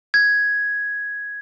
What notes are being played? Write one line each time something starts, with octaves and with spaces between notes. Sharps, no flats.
G#6